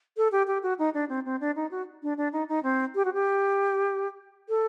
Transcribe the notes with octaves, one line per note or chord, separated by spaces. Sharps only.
A4
G4
G4
F#4
D#4
D4
C4
C4
D4
D#4
F#4
D4
D4
D#4
D#4
C4
G4
F#4
G4
A4